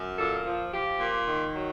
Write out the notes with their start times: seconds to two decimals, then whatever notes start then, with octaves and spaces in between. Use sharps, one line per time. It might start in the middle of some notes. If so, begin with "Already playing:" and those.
Already playing: F#2
0.17 A#2 A4
0.45 F3
0.72 F3 G4
1.00 A#2
1.27 D#3
1.54 F#3